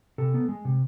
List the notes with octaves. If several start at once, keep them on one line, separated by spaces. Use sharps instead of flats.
C3 A4
B3
G#3
C3